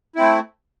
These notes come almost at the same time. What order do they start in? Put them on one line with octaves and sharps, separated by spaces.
E4 C4 A3